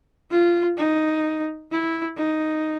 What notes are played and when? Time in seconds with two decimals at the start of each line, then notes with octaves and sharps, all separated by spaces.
0.31 F4
0.78 D#4
1.71 E4
2.18 D#4